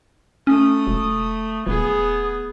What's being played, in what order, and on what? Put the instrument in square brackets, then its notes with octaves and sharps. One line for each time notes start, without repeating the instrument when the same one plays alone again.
[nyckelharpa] A3 D#6 [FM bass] C#4
[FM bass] E1
[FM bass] D#1 [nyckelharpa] B3 G#4